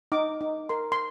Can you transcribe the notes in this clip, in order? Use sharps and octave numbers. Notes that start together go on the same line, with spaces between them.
D#4 D6
D#4
A#4 C6
C6